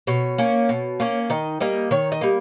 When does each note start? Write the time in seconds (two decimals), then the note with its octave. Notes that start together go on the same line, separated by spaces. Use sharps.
0.07 B2 C#5
0.38 A#3 C#4
0.69 B2
1.00 A#3 C#4
1.30 D#3 D#5
1.60 G3 A#3 D#5
1.91 D#3 C#5
2.12 D#5
2.21 G3 A#3